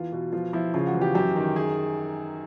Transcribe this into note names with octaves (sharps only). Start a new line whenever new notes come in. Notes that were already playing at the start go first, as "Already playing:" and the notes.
Already playing: E2 F4
B2
F3 F4
F3 E4
C#3 F4
F#4
E2
G4
F#2 G4
D#3
G#4